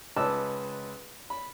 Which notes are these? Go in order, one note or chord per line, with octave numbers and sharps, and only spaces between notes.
C#2 B4 D#5 A5 D6 E6
B5